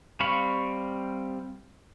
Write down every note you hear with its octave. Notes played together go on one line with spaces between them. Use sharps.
G3 C4 F5 B5 C#6